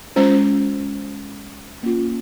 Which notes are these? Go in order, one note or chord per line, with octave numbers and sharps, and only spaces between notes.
G#3 C#4 F4 C5
A#3 C#4 F4